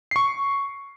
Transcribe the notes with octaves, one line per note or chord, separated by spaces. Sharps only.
C#6 C7